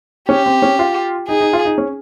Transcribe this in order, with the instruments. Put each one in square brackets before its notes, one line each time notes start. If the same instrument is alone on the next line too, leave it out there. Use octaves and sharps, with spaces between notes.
[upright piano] C#4 [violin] G4
[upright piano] C4
C#4
F4
[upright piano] D#4 [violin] G#4
[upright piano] D#4
F4
D#4
C#4